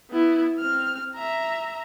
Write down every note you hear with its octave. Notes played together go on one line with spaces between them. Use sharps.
B3 E4
C4 F6
E5 A#5